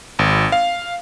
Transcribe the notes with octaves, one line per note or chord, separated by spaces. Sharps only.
G#1
F5